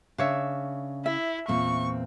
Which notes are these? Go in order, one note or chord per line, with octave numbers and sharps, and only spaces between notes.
C#3 D4 C#5 E5
E4 E5
E2 A#2 C4 C#6